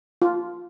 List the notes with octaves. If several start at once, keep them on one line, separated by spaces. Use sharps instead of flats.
F4